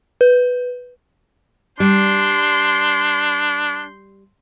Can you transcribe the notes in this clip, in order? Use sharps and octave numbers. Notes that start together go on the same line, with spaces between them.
B4
G3 D4 C6 G6